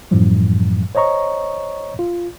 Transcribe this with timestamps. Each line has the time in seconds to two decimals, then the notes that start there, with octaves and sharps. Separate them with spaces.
0.11 F#2 A2 E3 F3 G3
0.95 C5 C#5 D#5 A#5 C#6
1.99 F4